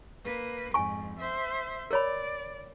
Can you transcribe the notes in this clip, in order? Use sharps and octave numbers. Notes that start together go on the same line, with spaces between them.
A#3 B4
F2 G#2 G#5 C#6
C5 E5
A#4 C#5 D5 B5